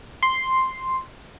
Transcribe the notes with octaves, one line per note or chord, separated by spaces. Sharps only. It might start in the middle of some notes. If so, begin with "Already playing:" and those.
C6